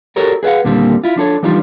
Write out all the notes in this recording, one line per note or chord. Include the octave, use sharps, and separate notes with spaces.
F#4 G4 A4 A#4 C#5 D5
G#4 B4 C#5 F5 F#5
D#2 A#2 D3 G3 A#3 C4
E4 F4
F3 D4 A4 C#5
E3 F3 G3 D4 D#4 F4